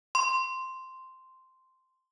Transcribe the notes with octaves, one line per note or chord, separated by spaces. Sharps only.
C6